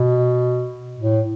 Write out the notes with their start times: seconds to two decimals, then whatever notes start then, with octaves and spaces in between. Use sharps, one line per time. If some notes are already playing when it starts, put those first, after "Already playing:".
Already playing: B2
0.99 A2